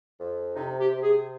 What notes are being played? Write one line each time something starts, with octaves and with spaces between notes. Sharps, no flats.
F2
C3 D#4
G4
C3
G#4